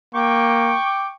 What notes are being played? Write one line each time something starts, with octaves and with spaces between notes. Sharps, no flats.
A#3 G5 C#6 D6